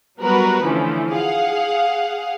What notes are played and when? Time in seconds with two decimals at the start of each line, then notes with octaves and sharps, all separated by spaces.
0.21 F#3 G3 B3 F#4 A#4 B4
0.64 D3 E3 F3 A3 C#4
1.12 G#4 F5 F#5